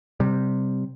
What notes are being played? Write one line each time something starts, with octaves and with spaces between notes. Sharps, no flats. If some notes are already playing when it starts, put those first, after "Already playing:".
C3 G3